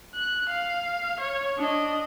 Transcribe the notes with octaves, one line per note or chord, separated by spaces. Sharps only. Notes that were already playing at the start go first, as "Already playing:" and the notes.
F#6
F5
C#5
D4 D#5